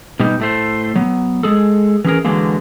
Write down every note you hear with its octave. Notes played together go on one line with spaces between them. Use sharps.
B2 G3 D#4
A2 A3 C5
F#3 B3
G#3 G#4 A4
E3 C#4 G#4 A#4
D3 E3 F#3 G#3 A#3